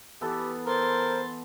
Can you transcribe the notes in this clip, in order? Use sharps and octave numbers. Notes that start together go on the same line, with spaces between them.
E3 B3 G4 A4
A#4 C5 C6 A6